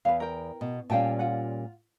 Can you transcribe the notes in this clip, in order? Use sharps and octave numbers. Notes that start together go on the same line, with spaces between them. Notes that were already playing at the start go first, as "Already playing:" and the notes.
E2 B4 F5
A#4 G5
B2
A#2 G3 C#4 F5 G5 A5
F4 F#5